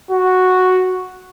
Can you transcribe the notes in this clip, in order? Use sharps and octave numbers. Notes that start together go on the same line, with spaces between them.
F#4